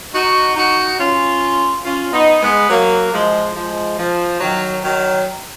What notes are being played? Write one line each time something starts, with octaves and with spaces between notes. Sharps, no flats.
D#4 F#4
D#4 F#4
C#4 F4
C#4 F4
B3 D#4
G#3 B3
F#3 A#3
F3 G#3
F3 G#3
F3
D#3 F#3
D#3 F#3